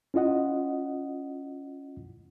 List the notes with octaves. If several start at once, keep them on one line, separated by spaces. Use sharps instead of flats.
C#4 E4 F4 D#5 F#5